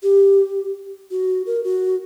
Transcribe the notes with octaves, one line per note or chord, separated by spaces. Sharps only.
G4
F#4
A#4
F#4